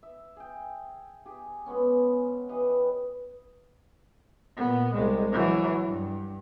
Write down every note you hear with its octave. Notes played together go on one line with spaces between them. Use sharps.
E5
G#4 G5
G4 G#4
B2 G#3 B3 C#4
E3 G4 B4 D#5
A#2 B3
C2 G#3
E3 F#3
G2